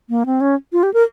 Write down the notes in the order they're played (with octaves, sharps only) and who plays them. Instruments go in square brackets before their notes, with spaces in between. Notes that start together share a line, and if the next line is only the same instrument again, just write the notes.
[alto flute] A#3
C4
C#4
F4
G4
A#4